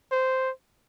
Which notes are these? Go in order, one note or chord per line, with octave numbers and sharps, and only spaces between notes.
C5